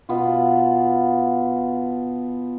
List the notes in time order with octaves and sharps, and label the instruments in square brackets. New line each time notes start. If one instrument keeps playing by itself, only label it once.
[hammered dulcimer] B2 B3 F4